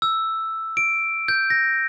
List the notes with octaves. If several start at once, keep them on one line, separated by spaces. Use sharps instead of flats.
E6
D7
G6
A#6